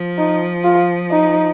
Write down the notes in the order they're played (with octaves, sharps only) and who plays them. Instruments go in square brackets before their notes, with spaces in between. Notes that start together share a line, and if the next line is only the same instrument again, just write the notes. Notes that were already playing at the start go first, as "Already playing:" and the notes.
Already playing: [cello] F3
[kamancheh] D#4
F4
D#4